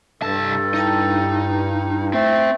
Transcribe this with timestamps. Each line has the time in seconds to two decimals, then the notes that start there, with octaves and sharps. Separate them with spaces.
0.22 C2 G2 A4 A5
0.74 D#4 E4 G5 A5
2.13 A3 C4 C5